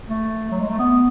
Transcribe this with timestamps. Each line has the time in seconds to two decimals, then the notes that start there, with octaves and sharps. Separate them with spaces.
0.09 A3
0.51 F#3
0.60 G#3
0.69 A3
0.79 B3